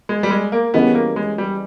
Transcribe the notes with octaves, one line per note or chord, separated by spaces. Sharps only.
G#3
G3
G#3
A#3
E3 G3 B3 C#4 G#4 D#5
A#3
G#3
G3